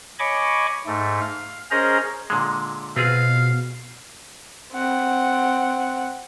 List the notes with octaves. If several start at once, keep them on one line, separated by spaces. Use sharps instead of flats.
C#5 D#5 G#5 B5 C#6 D6
G#2 A3
F5
C#4 G#4 A#4 C5 D#5 A#5
A#2 D3 G#3
B2 C4 F4 G#4 F5
C4 F#5